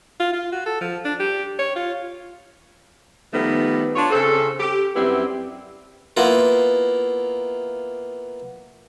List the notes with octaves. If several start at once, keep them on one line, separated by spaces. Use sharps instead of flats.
F4
F4
F#4
A4
F3
D4
G4
C#5
F4
D#3 F3 G3 A3 B3
D4 F4 C#5
C#3 C4 A4
G4
F#2 G3 B3 C4 E4
A#3 B3 E4 F4 A#4